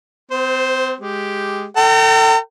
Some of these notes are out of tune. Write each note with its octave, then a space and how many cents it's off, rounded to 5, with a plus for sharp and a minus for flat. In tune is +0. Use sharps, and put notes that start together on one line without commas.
C4 -35 C5 +0
G#3 +0 G4 +0
A4 +30 G5 -35 A#5 -40